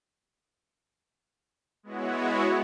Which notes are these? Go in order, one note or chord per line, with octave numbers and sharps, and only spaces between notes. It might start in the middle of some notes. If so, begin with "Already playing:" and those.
G#3 B3 E4 F#4 C#5